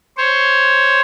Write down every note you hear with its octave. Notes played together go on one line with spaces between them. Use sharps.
C5 C#5